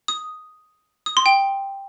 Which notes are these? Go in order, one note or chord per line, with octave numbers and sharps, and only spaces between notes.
D#6
D#6
C6
G5